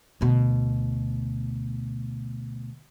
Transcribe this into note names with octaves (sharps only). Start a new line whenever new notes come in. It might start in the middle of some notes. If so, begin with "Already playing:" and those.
D2 B2